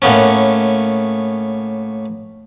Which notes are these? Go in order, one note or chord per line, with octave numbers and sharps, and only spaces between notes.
A2 A#3 B3 C#4